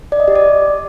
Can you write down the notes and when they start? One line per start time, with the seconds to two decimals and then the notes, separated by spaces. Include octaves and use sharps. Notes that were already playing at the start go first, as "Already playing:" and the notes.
0.12 D5
0.20 D#5
0.28 G4
0.35 D5